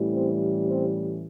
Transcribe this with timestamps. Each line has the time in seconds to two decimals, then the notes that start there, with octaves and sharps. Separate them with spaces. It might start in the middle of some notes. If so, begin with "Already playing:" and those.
Already playing: A1 A2 E3 G3
0.12 C4
0.67 C4